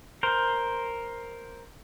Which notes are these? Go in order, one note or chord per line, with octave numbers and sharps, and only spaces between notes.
A#4 C5